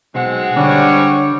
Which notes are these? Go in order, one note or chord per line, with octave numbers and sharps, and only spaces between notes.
B1 G#3 C4 F#5
D3 G3 C#5